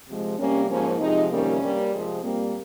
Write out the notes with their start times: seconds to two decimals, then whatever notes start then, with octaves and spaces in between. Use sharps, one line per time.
0.08 C3 F3 G#3
0.39 C3 G3 A#3 C#4
0.69 G#2 F3 A#3 C#4
1.00 F2 C3 F3 G#3 D#4
1.30 F2 C3 D#3 G3 A#3 C#4
1.62 G2 G3 A#3
1.92 C3 F3 G#3 C4
2.23 A#2 G3 A#3 C4